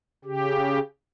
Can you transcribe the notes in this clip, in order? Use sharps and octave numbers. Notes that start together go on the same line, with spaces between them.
C#3 G4